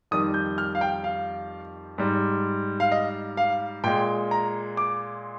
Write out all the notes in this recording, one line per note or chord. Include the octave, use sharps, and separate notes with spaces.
F2 D#3 G3 D#6
G6
F6
F5
G5
F5
G#2 G3
F5
D#5
F5
A#2 G#3 G5
A#5
D6